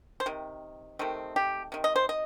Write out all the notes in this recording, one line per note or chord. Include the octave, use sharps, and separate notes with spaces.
C5
C3 D#3
C3 D#3 A3 C4
G4
C3 D#3
D#5
C5
D#5